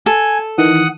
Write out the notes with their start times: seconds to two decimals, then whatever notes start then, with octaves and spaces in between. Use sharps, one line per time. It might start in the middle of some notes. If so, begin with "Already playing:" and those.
0.06 A4 G#5
0.58 D#3 E3 F#5 D#6